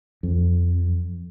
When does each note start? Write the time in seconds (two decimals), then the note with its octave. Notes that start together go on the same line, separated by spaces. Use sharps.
0.23 F2